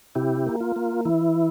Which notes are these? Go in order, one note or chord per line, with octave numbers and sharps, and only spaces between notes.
C3 E4 G4
A#3
F4
A#3
E3 E4